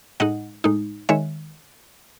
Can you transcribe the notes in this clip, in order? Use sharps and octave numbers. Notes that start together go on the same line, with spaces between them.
A2 G#3 D#4 D#5 F#5
A2 G#3 D#4
D#3 G#3 C#5 E5